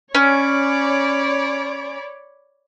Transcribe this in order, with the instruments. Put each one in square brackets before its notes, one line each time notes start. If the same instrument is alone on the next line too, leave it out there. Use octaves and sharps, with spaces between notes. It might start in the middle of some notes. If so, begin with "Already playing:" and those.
[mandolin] C#4 [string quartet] C#5 D5 B5